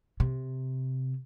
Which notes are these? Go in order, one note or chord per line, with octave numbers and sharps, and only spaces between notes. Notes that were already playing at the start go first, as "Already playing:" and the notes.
C3